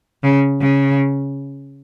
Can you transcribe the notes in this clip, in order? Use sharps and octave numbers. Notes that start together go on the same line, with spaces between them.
C#3
C#3